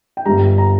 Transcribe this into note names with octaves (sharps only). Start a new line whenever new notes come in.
G5
G1 G2 G3 A#5
A#5